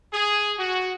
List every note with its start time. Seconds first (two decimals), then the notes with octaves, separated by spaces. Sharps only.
0.13 G#4
0.59 F#4